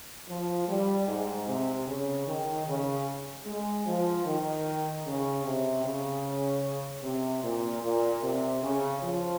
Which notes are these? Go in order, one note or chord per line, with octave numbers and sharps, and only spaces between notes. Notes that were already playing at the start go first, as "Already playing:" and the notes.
F3
G3
G#2
C3
C#3
D#3
C#3
G#3
F3
D#3
C#3
C3
C#3
C3
A#2
A#2
C3
C#3
F3